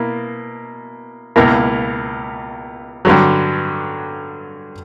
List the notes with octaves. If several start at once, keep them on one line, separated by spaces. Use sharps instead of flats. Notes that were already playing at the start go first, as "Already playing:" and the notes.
Already playing: B2 A#3 E4
C#2 B2 A#3 E4 A#4
G2 D3 F#3